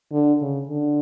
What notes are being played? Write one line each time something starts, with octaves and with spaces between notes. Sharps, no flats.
D3
C#3
D3